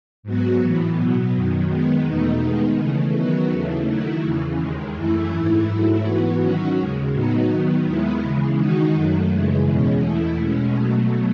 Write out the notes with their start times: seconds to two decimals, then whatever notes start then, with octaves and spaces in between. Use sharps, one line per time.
0.23 G#2 F#3 B3 F#4
0.60 A2 E3 B3
0.96 B2 F#3 B3
1.32 F#2 D#3 F#3
1.68 D#3 G#3 B3
2.05 E2 B2 A3 D#4
2.41 D#3 G#3 B3
2.77 C#3 E3 A3
3.13 D#3 F#3 B3 F#4
3.50 D#2 C#3 E3 A3
3.87 D#3 F#3 A3 E4
4.22 E2 C#3 E3
4.59 D#2 D#3 G#3
4.95 F#2 E3 A3 E4
5.31 G#2 E3 A3 E4
5.67 G#2 F#3 A3 E4
6.03 G#2 E3 B3 F#4
6.40 D#3 F#3 C#4 F#4
6.76 D#2 C#3 G#3
7.12 A2 F#3 B3 D#4 F#4
7.49 D#3 F#3 B3
7.85 D#2 D#3 G#3 B3 E4
8.21 C#3 E3 G#3
8.58 D#3 G#3 D#4 F#4
8.94 F#2 D#3 F#3 A3
9.30 F#2 C#3 E3 G#3
9.66 E2 B2 G#3 C#4
10.03 E2 B2 A3 E4
10.39 B2 G#3 C#4
10.75 B2 F#3 A3